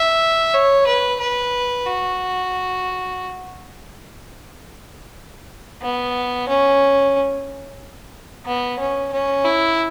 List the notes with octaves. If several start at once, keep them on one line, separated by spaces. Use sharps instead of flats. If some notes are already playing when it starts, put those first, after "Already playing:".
Already playing: E5
C#5
B4
B4
F#4
B3
C#4
B3
C#4
C#4
E4